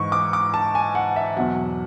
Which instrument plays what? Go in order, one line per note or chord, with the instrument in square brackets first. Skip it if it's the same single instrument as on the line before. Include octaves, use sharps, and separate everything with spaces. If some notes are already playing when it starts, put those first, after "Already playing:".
Already playing: [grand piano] G#2 E3 C#6
D6
D6
A5
G#5
F#5
E5
E2 B2 F#3 F#5